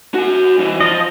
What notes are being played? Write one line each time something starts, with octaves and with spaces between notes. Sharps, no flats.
F#4 G#5
C2 E3
F3 D#5